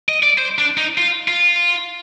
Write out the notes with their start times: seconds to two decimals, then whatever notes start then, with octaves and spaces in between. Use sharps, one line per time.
0.09 D#5
0.23 D5
0.38 C5
0.58 D4
0.78 D#4
0.98 F4
1.28 F4